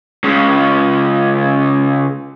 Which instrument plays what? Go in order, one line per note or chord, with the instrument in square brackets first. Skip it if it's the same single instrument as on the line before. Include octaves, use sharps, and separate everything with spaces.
[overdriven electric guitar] C#2 C#3